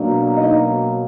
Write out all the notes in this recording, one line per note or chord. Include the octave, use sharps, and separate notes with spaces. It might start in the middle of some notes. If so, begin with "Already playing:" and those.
Already playing: B2 F#3 A#3 D4
D#4 D#5